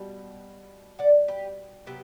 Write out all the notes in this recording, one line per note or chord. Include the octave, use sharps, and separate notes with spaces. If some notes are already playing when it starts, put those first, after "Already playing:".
Already playing: B2 G3
D5 F#5
G4 B4
C3 F#3 B3 G4 B4